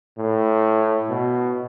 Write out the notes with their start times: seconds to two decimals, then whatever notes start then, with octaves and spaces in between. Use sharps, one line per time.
0.18 A2
1.10 B2